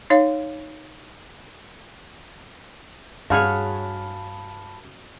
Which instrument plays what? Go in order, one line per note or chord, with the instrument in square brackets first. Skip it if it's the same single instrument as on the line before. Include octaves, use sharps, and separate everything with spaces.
[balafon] D#4 C#5 F5
[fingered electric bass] G2 [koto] F#4 G#4 C#5 [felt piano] F5 F6 [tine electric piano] A5 B5